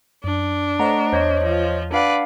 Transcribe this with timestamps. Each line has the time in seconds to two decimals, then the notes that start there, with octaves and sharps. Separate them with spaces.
0.24 F#2 D4
0.79 A3 C5 C#5 D#5 F#5 A#5
1.13 E2 C5 C#5 D#5
1.43 F3 F4
1.92 D4 B4 D5 F5 F#5